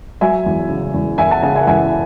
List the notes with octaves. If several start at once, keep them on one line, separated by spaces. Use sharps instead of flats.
F#3 E5 G#5
E2
C#3
E2
E2 E5 G#5
F#5 A5
C#3 F#5 A5
E5 G#5
F#5
E2 E5 G#5